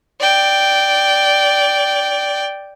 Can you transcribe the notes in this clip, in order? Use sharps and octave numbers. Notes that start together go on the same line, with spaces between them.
D5 G5